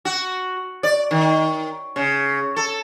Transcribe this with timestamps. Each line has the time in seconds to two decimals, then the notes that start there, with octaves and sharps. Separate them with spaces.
0.05 F#4
0.83 D5
1.11 D#3
1.96 C#3
2.56 A4